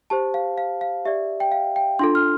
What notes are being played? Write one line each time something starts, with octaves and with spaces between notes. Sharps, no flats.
G4 C5 A5
F5
F5
F5
G4 D5 E5
G5
F5
G5
D4 F4 A4 C6
F6